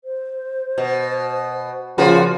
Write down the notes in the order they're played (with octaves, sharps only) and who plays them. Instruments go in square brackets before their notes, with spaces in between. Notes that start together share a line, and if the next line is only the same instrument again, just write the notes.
[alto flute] C5
[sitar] B2
[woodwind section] A#2 C#3 F3 [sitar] F4 F#4 B4